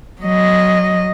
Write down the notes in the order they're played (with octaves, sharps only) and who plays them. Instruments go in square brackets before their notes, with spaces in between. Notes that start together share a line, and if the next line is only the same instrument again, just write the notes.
[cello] F#3 D#5